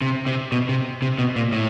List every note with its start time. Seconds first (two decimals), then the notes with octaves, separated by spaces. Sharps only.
0.01 C3
0.26 C3
0.52 B2
0.69 C3
1.02 C3
1.18 B2
1.36 A#2
1.52 A2